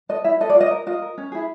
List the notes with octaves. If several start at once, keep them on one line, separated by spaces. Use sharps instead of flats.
A4 D#5
E4 E5
A4 D#5
D5
F4
D#5
A#4
F4 D#5
A#4
C#4
E4 G#4